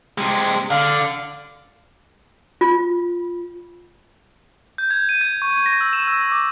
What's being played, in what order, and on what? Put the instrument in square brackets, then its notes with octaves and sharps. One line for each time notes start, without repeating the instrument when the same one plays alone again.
[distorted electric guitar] C3 G#3
[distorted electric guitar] D3 [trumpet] F5
[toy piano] F4
[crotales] G6
G#6
D#7
G#6
C#6
A#6
E6
E7
E6
D6